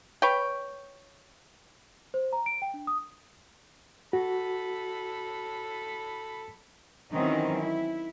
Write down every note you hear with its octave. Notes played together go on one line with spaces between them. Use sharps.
B4 C#5 G5
C5
A#5
D7
G5
D4
D#6
F#4 A4 B5
D#3 E3 F#3 C4 C#4 D#4
E4